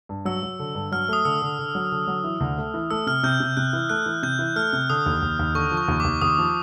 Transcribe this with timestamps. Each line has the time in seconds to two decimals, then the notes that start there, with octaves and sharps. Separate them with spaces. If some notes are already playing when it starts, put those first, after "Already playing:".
0.09 G2
0.25 F#3 E6
0.43 F#3
0.59 D3
0.75 G2
0.92 F#3 F6
1.09 A3 D#6
1.25 D3 E6
1.42 D3
1.59 D3
1.75 F#3
1.92 D3
2.07 F#3
2.24 E3
2.40 D2
2.58 A3
2.74 E3
2.91 A3 E6
3.06 C3 F6
3.23 C3 G6
3.40 C3
3.57 C3 F#6
3.73 E3
3.89 A3 F#6
4.06 E3
4.23 C3 G6
4.39 E3
4.56 A3 F6
4.73 C3
4.90 D3 D#6
5.06 D#2
5.22 D#2
5.39 D#2
5.55 D3 C#6
5.71 F3
5.77 C#6
5.88 D#2
6.00 D#2 D6
6.21 D#2 D#6
6.38 F3